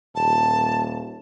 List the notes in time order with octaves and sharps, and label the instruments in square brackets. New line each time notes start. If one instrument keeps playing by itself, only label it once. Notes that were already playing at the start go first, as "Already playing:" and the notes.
[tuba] D#1 [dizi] A5